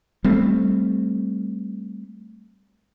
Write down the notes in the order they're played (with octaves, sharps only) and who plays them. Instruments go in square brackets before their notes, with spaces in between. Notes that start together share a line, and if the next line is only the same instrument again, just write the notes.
[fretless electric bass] G3 A3 C4